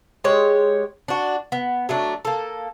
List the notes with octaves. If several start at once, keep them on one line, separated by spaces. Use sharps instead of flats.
G#3 G4 C#5
D4 F#4
B3
F#3 A3 D4
A#3 A4